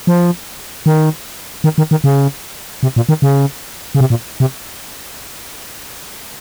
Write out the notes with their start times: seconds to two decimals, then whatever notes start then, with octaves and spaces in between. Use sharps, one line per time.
0.07 F3
0.86 D#3
1.64 D#3
1.78 D#3
1.91 D#3
2.04 C#3
2.83 C3
2.96 A#2
3.09 D#3
3.22 C#3
3.95 C#3
4.01 C3
4.10 A#2
4.40 C3